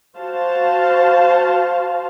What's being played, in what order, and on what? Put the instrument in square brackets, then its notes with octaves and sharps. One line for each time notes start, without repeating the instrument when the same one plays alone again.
[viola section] F#4 C5 F5 A5